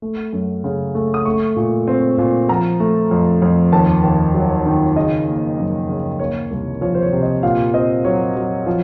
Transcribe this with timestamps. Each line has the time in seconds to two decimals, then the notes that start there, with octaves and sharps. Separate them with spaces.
0.02 A3
0.33 F#2
0.64 C#3
0.95 A3
1.14 D#6
1.25 A3 C#6
1.56 A#2
1.88 C4
2.18 A#2
2.49 F3 A#5
2.80 A3
3.11 F2
3.42 F2
3.72 D#2 A5
4.03 D#2
4.34 F#3
4.66 D#3
4.96 C#3 D#5
5.28 A#3
5.58 F#2
5.89 C#3
6.19 A#3 C#5
6.51 C2
6.81 F3 C#5
6.95 C5
7.02 C#5
7.12 C3
7.23 D#5
7.43 A#2 F5
7.73 C4 D#5
8.05 F#3 C#5
8.36 F#3
8.66 F3